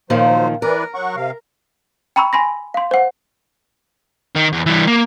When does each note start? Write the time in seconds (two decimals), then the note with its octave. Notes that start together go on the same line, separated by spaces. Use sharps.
0.10 A#2 D#3 F3 F#3 C5
0.62 E3 A#4 B4 D5
0.95 F#3 F#5 C#6
1.16 C3 F5
2.16 G5 A#5 B5 C#6 E6
2.33 G#5 B5 C6 A#6
2.74 F5 C6
2.91 C5 F#5
4.35 D#3
4.53 E2
4.66 E3 G3
4.87 A#3